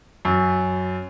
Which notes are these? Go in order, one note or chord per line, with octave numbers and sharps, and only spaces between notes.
F#2